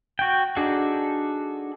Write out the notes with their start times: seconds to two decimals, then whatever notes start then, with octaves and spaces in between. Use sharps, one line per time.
0.19 F#4 G5
0.56 D4 D#4 F#4 G#4 A4